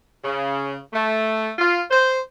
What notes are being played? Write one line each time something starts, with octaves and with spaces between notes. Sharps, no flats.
C#3
A3
F4
C5